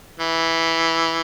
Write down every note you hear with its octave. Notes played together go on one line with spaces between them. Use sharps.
E3